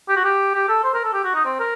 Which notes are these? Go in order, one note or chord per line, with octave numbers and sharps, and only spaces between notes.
G4
F#4
G4
G4
A4
C5
A#4
A4
G4
F#4
D#4
C4
A#4